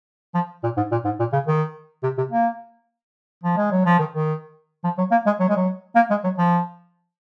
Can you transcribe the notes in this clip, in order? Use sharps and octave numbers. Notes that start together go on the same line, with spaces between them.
F3
A#2
G#2
A#2
G#2
A#2
C#3
D#3
C3
C3
A#3
F3
G#3
F#3
F3
D#3
D#3
F3
F#3
A#3
G#3
F#3
G#3
F#3
A#3
G#3
F#3
F3